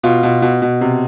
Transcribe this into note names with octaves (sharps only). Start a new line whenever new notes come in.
B2 F4
B2
B2
B2
C3